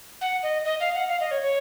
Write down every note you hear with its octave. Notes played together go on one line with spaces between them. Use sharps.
F#5
D#5
D#5
F5
F#5
F5
D#5
C#5
C#5